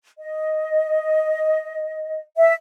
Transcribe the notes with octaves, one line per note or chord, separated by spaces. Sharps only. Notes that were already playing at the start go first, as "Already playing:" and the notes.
D#5
E5